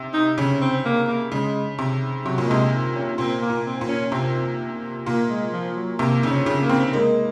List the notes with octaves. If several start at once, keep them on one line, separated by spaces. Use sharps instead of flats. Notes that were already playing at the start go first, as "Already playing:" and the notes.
Already playing: C3
D#4
C#3 C#4
C4
A#3
A#3
C#3 G#3
C3
C3 F#3
A#2
C3 G#3
C#4
A#2 C4
A#3
A#2
C4
A#2
C#4
C3 C4
A#2 A#3
G#3
F3
F#3
C3 A#3
C#3 D#4
C#4
C#3
A#3
C4
G#3 A#3